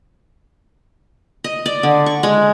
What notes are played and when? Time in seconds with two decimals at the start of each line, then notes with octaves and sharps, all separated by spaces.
1.44 D#5
1.66 D5
1.83 D3
2.06 C#6
2.23 G#3